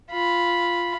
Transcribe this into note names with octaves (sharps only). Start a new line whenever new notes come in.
F4 B5